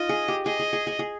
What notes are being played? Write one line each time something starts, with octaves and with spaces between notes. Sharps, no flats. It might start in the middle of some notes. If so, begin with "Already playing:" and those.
Already playing: D#4 F4 D#5
G#4
G4
G#4 D#5
G#4
G#4
G#4
G#4